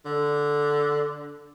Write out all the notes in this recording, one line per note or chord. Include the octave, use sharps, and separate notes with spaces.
D3